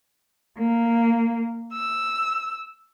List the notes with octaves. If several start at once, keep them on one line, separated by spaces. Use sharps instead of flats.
A#3
E6